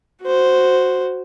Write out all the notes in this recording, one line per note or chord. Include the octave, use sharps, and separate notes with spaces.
F#4 C5